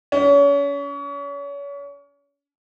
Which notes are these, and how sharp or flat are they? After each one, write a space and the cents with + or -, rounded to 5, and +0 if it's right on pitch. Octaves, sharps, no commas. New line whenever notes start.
C#4 +35